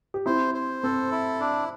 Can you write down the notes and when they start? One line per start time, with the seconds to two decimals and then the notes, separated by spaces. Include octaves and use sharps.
0.14 G4
0.26 C4 E4 C5
0.55 C5
0.83 C4 A4
1.12 E4
1.40 D4